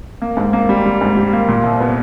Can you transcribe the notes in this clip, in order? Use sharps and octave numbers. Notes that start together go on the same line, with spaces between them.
A#3
G#2
A#3
G3
G3
G#2
G3
A#3
A#2
C2
B3